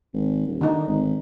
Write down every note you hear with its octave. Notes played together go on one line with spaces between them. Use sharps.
G#1
D#1
D3 D#3 D#4
G#1